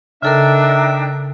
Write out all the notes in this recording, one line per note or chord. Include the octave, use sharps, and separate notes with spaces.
C#3 D4 D#4 A4 A#4 E5 G5